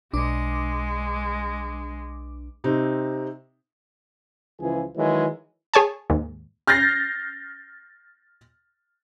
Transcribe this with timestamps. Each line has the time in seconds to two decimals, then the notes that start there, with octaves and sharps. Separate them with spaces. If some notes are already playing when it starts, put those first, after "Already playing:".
0.13 B1 G#3 D4 D6
2.64 C3 C4 D#4
4.60 C#2 E3 F3 G#4
4.96 D#3 E3 F#3 G#3
5.74 G#4 C#5 G#5 A5
6.10 D#2 G#2
6.67 F6 G6 A6 A#6 C7